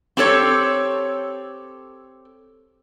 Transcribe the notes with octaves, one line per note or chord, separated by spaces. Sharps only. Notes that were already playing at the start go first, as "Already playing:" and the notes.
C4 G4 A4 C#5